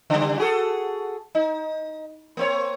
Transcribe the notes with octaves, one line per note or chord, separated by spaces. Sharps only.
C#3 G3
F#4 G#4 A4
D#4
A#3 C4 C#5